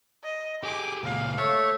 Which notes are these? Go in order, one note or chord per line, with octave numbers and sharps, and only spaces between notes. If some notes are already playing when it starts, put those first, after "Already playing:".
D#5
G4 G#4 D6
C#2 A#2 F5
A3 C#5